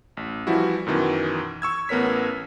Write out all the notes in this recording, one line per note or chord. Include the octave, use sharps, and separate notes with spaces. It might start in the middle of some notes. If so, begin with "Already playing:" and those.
A1
E3 F3 G3 E4 F#4
F#2 B2 D#3 E3
C#6 E6 G#6
A1 B3 A#4 C#5 B6